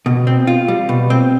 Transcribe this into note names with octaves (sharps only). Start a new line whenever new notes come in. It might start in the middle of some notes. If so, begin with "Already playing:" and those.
B2
C4
F4
G3
B2
C4